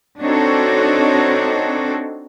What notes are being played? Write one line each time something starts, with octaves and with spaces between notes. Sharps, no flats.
C4 D4 D#4 F#4 A4 C#5